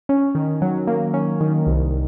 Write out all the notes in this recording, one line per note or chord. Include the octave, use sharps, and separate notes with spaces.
C#4
D#3
F#3
A#3
C#4
D#3
C2